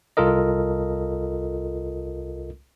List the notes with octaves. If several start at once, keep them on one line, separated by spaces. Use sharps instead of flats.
C2 F4 A4 A#4 D#5